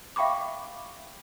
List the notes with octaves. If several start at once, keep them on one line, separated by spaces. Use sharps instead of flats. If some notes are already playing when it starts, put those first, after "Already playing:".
E5 F5 G5 B5 C#6 D6